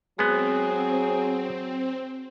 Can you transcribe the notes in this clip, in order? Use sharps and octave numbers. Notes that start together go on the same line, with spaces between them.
F#3 G#3 B3 C4 G#4